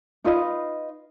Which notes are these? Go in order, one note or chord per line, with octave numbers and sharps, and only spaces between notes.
D#4 F4 B4 D#5